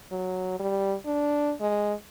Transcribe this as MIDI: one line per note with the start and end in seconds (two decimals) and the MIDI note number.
0.12 0.58 54
0.60 0.95 55
1.06 1.53 62
1.61 1.93 56